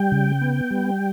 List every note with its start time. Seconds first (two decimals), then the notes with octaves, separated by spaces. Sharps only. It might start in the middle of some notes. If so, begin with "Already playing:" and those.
Already playing: G3 G5
0.12 C#3
0.41 B3
0.70 G3